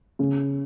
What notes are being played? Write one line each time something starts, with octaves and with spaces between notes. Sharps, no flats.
C#3